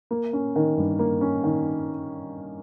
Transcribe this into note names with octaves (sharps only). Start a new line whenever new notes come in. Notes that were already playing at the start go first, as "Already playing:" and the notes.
A#3
C#4
D#3
G2
A#3
C#4
D#3